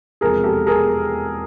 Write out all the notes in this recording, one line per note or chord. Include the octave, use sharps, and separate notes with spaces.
E1 E2 C3 F3 A#3 G#4 A#4
G4 A4
G#4 A#4